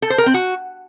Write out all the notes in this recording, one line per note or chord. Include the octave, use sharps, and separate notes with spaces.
A4
C5
A#4
C4
F#4